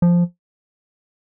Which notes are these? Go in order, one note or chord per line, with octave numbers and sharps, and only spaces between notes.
F3